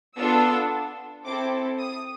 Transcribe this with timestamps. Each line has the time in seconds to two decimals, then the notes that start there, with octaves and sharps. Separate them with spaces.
0.17 B3 D4 F4 A4 E6
1.26 C4 E4 A4 D6
1.79 D#6